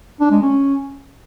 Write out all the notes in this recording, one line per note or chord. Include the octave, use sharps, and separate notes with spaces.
D4
G#3
C#4